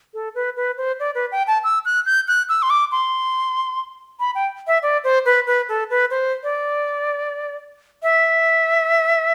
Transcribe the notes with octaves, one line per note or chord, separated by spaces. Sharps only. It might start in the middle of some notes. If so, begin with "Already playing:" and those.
A4
B4
B4
C5
D5
B4
G5
A5
E6
F#6
G6
F#6
E6
C6
D6
C6
B5
G5
E5
D5
C5
B4
B4
A4
B4
C5
D5
E5